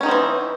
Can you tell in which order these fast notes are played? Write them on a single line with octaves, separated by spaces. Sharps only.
C#4 D#4 D#3 C4 E3